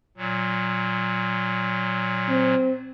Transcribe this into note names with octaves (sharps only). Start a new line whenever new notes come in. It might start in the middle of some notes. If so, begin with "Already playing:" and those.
A#2 F#3
C4